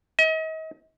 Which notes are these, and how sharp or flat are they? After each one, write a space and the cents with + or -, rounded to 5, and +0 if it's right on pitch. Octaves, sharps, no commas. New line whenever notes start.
D#5 +40